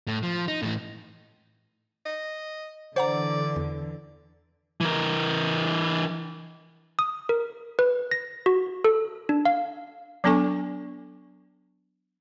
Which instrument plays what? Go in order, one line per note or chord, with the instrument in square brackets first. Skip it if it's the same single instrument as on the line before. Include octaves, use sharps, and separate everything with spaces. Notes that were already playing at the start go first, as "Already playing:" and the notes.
[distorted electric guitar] A2
F3
D#4
A2 E3
[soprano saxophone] D#5
[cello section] D3 E3 [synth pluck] C5 F#5 A#5 [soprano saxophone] D5
[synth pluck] E2
[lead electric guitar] E3 A#4
[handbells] D#6
A#4
B4
A#6
F#4
A4
D4
F5
[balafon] F#3 B3 D4 A4 G#5 C#6